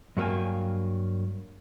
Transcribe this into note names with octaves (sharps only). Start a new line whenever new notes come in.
G2 F#3 A#3 G5 G#5